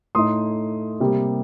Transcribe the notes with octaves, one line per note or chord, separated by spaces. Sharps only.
A2 A3 D#4 C6 D#6
C3 G3 A#3